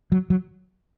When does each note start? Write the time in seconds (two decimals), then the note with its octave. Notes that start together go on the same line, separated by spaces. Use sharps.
0.12 F#3
0.30 F#3